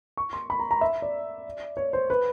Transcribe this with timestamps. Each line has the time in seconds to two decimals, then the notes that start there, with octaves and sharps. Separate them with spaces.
0.17 C#6
0.33 C6
0.50 B5
0.60 A#5
0.71 A#5
0.81 E5
1.02 D5
1.77 C#5
1.93 C5
2.10 B4